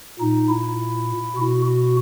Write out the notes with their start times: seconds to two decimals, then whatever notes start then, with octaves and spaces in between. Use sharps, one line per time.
0.19 A#2 D#4
0.49 E4
1.36 B2 F#4
1.66 F#4